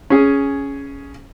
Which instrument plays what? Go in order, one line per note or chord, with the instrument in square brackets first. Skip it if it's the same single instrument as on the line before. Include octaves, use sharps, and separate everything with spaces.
[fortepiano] C#4 G#4